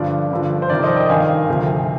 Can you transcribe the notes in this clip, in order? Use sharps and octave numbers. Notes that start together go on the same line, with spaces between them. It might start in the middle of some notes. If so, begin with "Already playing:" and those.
Already playing: G2 D3 F3 D5 F5
G2 D3 F3
C5
F2 C3 D#3 A#4 D5
C5 D#5
D#5 G5
G2 D#3 F5 G#5
D2 C3 F3